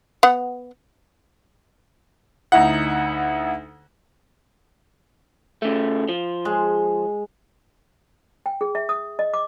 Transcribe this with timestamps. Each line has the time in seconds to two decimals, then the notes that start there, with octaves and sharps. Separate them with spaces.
0.23 B3 F#5
2.52 D2 D#4 E4 F#5
5.62 C#3 A3
6.08 F3
6.45 G#3
8.46 G5
8.61 G#4
8.75 E5
8.89 D#6
9.19 D#5
9.34 D6